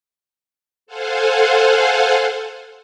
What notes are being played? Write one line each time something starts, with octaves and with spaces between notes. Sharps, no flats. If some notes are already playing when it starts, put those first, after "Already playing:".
A4 C5 F5 F#5 G#5